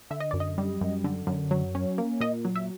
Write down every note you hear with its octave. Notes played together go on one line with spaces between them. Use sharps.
D3 E5
D#5
F#2 D5
D#5
G3
F#2
D3
F#2
F#3
C#4
A#3
A#2 D#5
F#3
E5